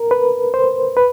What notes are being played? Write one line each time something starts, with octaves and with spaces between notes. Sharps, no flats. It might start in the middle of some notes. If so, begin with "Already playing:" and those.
Already playing: A#4
B4
C5
B4